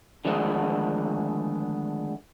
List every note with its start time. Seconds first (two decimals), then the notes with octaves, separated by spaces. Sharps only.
0.25 D3 D#3 F3 G#3 A3 B3